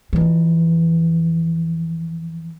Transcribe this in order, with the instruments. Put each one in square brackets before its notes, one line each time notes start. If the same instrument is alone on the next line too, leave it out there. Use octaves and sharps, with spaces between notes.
[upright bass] F2 E3